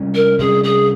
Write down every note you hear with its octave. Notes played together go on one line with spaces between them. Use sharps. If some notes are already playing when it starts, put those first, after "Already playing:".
Already playing: C3 G3 C#4
A#4
C3 G3 C#4 G#4
G#4